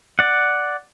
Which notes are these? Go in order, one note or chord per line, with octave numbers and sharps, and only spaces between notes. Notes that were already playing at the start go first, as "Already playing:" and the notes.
D5 F#5